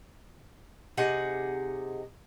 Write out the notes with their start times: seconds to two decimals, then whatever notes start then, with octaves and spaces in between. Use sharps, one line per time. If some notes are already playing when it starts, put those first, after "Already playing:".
0.97 C3 D#4 G#4 F#5